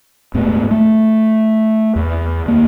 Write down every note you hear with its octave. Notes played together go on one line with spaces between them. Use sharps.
D#1 G#2 A3 B3
A3
E2
D2 A#3